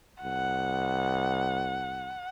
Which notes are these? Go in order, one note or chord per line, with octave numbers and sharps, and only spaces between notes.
C2 F#5